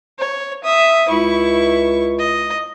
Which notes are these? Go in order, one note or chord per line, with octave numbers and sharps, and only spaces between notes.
C#5
E5 D#6
C#2 E4 C#6
D#5